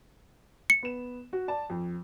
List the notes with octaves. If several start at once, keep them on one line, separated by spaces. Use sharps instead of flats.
C#7
B3 E7
F#4
D5 A5
F2